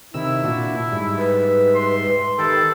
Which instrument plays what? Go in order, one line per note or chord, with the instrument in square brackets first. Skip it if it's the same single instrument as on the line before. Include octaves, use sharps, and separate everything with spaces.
[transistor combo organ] C3 D#3 E6 [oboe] E4
[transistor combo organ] A#2 D4 F#4
G#2 G3 E5
[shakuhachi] B4
[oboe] C6
[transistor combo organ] D#3 B4 G5 [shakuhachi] G4 [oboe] A4